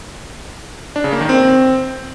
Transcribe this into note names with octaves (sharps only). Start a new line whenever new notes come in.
D4
C#3
A#3
D#3
C4